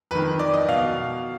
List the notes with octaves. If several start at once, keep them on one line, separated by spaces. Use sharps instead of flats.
F2 D#3 B4
D5
D#5
B2 F5